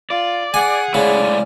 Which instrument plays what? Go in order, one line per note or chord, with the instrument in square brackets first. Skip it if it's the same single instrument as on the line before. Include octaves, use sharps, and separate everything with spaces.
[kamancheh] F4 [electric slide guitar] D5
[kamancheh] G#4 F#5 [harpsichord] G#5
[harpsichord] C#3 [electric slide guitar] G#3 A3 E4 [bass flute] D5